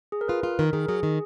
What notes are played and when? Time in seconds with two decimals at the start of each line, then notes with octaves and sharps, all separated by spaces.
0.12 G#4
0.21 A#4
0.28 F4 B4
0.43 F4
0.59 D#3 A#4
0.73 D#3 G#4
0.88 F#3 G#4
1.03 D#3